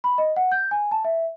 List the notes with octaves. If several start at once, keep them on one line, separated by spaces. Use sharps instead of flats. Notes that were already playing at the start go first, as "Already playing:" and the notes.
B5
D#5
F#5
G6
G#5
A5
E5